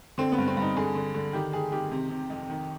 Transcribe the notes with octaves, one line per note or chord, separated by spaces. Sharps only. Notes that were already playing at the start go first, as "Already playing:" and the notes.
D3 C4
B3
G2
C4
G2
D#4
D3 G#4
D3
D3
D#3 G4
D#3 G#4
D#3 G4
C3
C3
F2
D#3